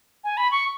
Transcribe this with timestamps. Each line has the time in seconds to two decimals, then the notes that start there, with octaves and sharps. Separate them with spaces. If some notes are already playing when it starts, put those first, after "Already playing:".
0.24 G#5
0.37 B5
0.52 C#6